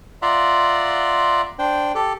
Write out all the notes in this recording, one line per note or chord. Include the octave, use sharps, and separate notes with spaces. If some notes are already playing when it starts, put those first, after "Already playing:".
F4 D5 E5 F#5 A#5 C6
D4 C5 G5
G4 A4